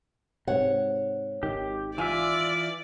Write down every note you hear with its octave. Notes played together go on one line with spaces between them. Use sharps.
G#2 C3 C#5 F#5
G#1 D#3 G4
E3 F4 D5 E5 G#5